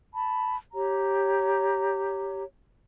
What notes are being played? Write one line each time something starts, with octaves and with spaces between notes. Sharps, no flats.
A5 B5
G4 C#5 A#5